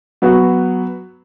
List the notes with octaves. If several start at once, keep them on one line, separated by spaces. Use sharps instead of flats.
F#3 B3 F#4